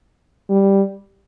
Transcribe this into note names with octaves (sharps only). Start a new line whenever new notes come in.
G3